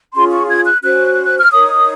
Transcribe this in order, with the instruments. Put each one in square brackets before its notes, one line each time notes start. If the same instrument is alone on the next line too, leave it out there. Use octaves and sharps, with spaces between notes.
[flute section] C#4 F4 G#4 C6
C#6
G#6
F#6
C#4 F#4 C5 F#6
F#6
F6
D#4 A#4 C#5 D#6